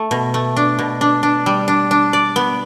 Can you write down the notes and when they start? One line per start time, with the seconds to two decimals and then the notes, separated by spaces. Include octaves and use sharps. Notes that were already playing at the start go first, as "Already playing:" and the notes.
Already playing: A3
0.11 B2
0.34 A3
0.56 D4
0.79 B2
1.01 D4
1.23 D4
1.46 G3
1.68 D4
1.91 D4
2.13 D5
2.36 B3